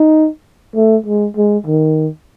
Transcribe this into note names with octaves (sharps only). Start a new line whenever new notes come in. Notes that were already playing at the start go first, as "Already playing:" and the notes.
Already playing: D#4
A3
G#3
G#3
D#3